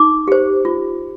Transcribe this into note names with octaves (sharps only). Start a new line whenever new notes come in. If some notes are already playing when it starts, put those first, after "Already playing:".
Already playing: D#4 D6
G4 C5
F4